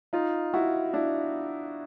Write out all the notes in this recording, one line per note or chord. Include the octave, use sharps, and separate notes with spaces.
D#4 F4
E4 F#4
D4 E4